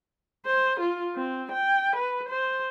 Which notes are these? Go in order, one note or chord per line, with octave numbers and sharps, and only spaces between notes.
C5
F4
C4
G5
B4
C5